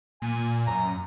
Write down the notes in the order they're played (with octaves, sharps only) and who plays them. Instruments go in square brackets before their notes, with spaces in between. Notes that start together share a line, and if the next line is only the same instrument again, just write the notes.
[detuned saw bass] A#2 [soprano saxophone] G#5
[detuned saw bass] F#2 [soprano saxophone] A#5